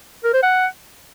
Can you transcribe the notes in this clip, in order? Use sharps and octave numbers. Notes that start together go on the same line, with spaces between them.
A#4
C5
F#5